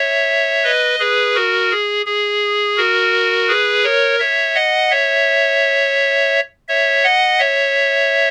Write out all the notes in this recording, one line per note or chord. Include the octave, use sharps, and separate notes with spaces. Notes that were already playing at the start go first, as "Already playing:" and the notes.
Already playing: C#5 E5
B4 D#5
G#4 B4
F#4 A#4
G#4
G#4
F#4 A#4
G#4 B4
A#4 C#5
C#5 E5
D#5 F#5
C#5 E5
C#5 E5
D#5 F#5
C#5 E5